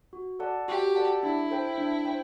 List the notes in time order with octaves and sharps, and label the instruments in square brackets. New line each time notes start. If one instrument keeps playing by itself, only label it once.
[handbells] F#4
A4 D5 F#5 A5
[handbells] F#4 [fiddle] G4
[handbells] A4 D5 F#5 A5
[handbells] D4 [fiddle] E4
[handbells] A4 C5 G5
D4
C5 G5